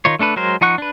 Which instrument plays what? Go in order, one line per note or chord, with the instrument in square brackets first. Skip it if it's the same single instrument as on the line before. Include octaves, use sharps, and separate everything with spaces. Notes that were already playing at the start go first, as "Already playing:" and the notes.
[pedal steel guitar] D#3 D#4 F4 C#5
A3 D4 A4 B4
F#3 G#3 A#4 C5
F3 D#4 F#5 C#6 F#6
D4 B4